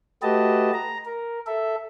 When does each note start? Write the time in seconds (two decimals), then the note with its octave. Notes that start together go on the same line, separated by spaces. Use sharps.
0.23 A3 F#4 G4 B4 D#5 A5
0.73 A#5
1.05 A#4
1.47 A4 E5